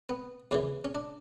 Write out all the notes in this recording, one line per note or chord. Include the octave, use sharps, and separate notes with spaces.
B3
D#2 C#3 E3 C#4
C#4
D4